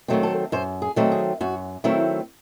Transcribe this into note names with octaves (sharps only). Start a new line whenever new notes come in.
D#3 F#3 A3 C4
A4
F#2 C5
G#4
D#3 F#3 A3 C4
G#4
F#2 F#4
D#3 F#3 A3 C4 E4